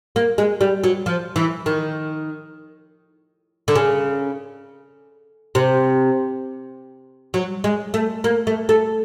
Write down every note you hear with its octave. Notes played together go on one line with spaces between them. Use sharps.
A#3
G#3
G3
F#3
F3
E3
D#3
D3
C#3
C3
F#3
G#3
A3
A#3
A3
A3